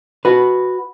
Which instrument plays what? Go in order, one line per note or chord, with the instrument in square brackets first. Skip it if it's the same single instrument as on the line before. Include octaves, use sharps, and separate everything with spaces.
[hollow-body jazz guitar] F#4 B4